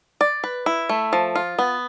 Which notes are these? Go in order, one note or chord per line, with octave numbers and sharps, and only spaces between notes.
D5
B4
E4
A3
F3
F4
B3